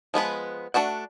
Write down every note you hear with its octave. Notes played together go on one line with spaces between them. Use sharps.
F3 G#3 B3 B4
A3 D4 F#4 F#5